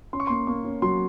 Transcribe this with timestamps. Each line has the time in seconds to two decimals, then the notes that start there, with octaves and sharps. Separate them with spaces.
0.13 C#4 C6
0.20 C#6
0.27 A#3 C6
0.47 A#3 C#6
0.65 C#4
0.82 F#3 C6